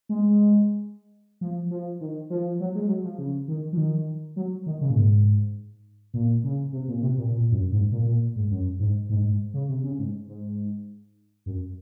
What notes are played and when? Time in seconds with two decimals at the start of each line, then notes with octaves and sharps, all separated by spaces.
0.09 G#3
1.41 F3
1.71 F3
2.01 D#3
2.30 F3
2.60 F#3
2.75 G#3
2.89 F#3
3.04 F3
3.18 C#3
3.48 D#3
3.73 F3
3.77 D#3
4.36 F#3
4.66 D#3
4.81 C#3
4.90 A#2
4.96 G#2
6.14 A#2
6.44 C#3
6.73 C3
6.88 A#2
7.02 C3
7.18 A#2
7.32 A#2
7.52 F#2
7.72 G#2
7.92 A#2
8.06 A#2
8.36 G#2
8.51 F#2
8.79 G#2
9.09 G#2
9.24 G#2
9.54 C#3
9.69 C3
9.83 C#3
9.99 G#2
10.28 G#2
11.46 F#2